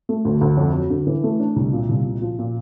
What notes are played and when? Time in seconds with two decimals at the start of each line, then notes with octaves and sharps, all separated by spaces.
0.09 A3
0.25 D2
0.41 D2
0.57 F2
0.74 F#3
0.90 D3
1.07 E3
1.24 A3
1.40 D4
1.56 C2
1.73 A#2
1.89 C2
2.05 A#2
2.22 F3
2.39 A#2